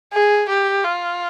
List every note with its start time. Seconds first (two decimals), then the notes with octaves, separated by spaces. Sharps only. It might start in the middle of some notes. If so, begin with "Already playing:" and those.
0.13 G#4
0.49 G4
0.84 F4